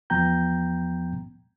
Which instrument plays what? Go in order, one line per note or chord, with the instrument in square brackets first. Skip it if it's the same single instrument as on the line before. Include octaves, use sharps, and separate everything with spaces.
[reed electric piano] E2 F3 B3 G5 A#5 G6